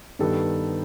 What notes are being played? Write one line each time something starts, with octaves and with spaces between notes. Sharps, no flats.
G2 D#3 G3 B3 A4